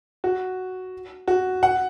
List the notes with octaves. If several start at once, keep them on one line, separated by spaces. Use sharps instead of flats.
F#4
F#4
F#5